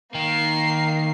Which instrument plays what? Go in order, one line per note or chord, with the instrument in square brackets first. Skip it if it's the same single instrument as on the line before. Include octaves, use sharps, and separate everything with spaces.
[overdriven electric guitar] D#3 [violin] A#3 C7